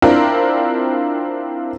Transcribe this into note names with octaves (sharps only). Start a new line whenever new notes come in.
C4 D4 E4 F4 A#4